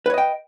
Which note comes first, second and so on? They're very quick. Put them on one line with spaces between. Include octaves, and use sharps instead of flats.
B4 C#5 D#5 G5